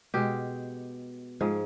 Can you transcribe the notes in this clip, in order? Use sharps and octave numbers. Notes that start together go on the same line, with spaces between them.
B2 G#3 G4
G#2 F3 G#3